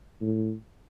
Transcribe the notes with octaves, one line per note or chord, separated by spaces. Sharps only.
A2